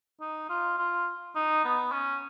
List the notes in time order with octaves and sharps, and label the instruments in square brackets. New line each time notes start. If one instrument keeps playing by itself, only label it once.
[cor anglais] D#4
F4
F4
D#4
B3
C#4